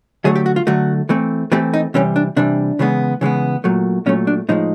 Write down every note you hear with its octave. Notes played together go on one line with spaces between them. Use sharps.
D3 F#3 A3 G#4
G4
F#4
F4
D3 F#3 A3 F#4
E3 A3 C4
E3 A3 C4 G4
D#4
C3 E3 G3 C#4
D4
C3 E3 G3 D4
C#3 E3 G#3 B3
C#3 E3 G#3 B3
A#2 F#3 A3
A#2 F#3 A3 C#4
D4
A2 F3 G#3 D#4